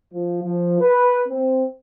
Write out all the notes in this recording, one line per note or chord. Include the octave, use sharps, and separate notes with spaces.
F3
F3
B4
C4